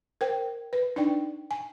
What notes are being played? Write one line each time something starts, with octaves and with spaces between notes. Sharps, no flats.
A#4 C5 G5
B4
D4 D#4 D5 G5
G#5